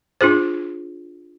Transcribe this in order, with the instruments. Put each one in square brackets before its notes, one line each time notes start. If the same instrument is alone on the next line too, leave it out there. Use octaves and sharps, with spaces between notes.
[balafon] D4 F4 G#4 C5